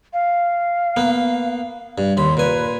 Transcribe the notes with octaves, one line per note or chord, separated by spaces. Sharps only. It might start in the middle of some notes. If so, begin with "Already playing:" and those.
F5
A#3 B3
G2
D#2 B5 C6
A#2 B4 G#5